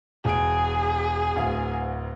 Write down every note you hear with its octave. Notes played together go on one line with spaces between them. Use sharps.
E1 G#4 D7
D1 D2 F5